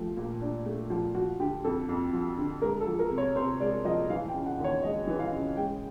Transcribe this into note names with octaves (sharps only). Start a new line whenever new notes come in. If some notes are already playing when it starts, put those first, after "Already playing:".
Already playing: F3 A3 G4
A#2
D4
A3
F3
F3 F#4
D3 G4
F2 A4
F2
F3
D3
G#3 A#4
A4
F3
A#4
C3
C#5
C3 C5
G#3 D5
F3 D#5
E3 F5
G5
C#3
F#5
D#2
C#5
G#3 D#5
E3
F5
C#3
G#3 G5